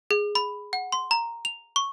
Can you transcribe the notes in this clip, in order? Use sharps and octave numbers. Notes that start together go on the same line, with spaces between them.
G#4
B5
F#5
C6
A#5
F7
C#6